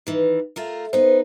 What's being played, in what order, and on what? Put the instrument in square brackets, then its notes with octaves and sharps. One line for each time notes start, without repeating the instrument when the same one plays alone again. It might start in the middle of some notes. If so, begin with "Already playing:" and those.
[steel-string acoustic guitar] D#3 E3
A3 F4 A#4
[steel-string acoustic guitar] B3 D#4 [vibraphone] C5